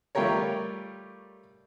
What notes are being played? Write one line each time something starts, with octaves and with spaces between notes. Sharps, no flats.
G3 A3 F4 G4 A#4 C#5